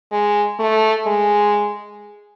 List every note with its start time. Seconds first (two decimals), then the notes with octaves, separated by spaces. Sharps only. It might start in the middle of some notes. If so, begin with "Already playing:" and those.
0.12 G#3
0.60 A3
1.07 G#3